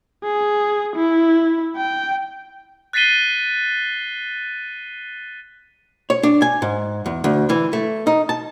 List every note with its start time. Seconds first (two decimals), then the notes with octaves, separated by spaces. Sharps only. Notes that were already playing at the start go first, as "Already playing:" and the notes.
0.24 G#4
0.96 E4
1.76 G5
2.93 F#6 A6 B6 C7 D#7 G7
6.10 C#5
6.23 D4
6.42 G#5
6.62 G#2
7.06 E2
7.24 D2
7.50 E3
7.73 A3
8.07 D#4
8.29 A5